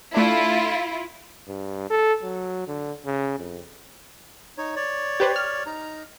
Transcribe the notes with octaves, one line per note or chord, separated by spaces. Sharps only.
A3 D4 E4 F4
G2
A4
F#3
D3
C#3
F2
D#4 C#5
C#5 D5
G4 B4 C5
F6
D#4 A#5